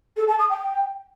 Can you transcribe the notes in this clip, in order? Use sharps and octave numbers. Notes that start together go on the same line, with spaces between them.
A4
A5
D#6
G5